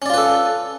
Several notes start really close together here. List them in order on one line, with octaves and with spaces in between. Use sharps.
C#4 D5 F4 B4 A4